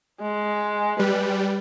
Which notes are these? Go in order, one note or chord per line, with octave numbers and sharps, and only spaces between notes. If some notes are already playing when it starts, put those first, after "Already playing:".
G#3
G3 B4